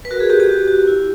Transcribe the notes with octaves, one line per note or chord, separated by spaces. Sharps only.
B4
F#4 A#4
G#4
F#4 G4
G4
F#4
F#4
E4